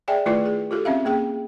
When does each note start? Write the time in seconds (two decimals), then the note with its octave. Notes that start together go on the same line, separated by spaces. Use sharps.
0.08 G#4 D5 E5 G5 G#5
0.25 D#3 A3 E4 F4 B4 D5
0.46 G#4
0.71 F4 G4 A4
0.85 C4 C#4 E5 F5
1.05 A#3 G#4 G5